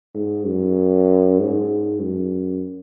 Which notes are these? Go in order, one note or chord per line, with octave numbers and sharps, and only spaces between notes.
G#2
F#2
G#2
F#2